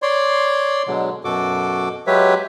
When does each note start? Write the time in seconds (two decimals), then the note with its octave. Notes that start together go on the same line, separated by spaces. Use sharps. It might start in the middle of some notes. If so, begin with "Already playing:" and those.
0.02 C#5 D5 C6
0.87 B2 D3 F#3 G#3
1.24 F#2 B2 F#4 A4 D6
2.07 F#3 G#3 G4 B4 C#5 E5